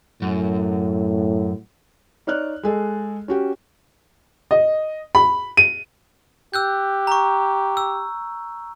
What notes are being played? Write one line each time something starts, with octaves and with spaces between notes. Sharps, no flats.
F#2 A2
D#4 C#5 D5 F6 F#6
G#3 G#4 A4 D#5
C#4 F#4 G4
D#5
B5
D#7
G4 E6 F#6 G6
A#5 C#6
E6